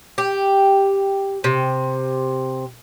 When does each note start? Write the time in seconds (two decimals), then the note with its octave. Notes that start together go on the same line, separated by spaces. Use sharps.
0.18 G4
1.44 C3